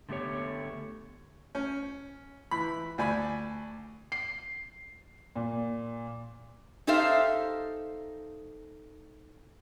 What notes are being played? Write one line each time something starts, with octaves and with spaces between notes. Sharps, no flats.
D3 A3 B3 G4 C#5
C#4
E3 B5
D2 D5 G#5 B5
C7
A#2
D#4 G4 A4 C5 E5 F5